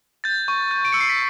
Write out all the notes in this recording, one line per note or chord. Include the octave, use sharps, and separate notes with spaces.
G6 A6
C#6
G6
D7
E6 C#7
C7
B6